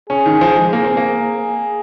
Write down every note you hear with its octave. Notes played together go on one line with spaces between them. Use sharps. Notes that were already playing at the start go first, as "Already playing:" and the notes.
C#4 G#4
D#3
F3
G#3
A#3 G#4
C4
A#3
G#4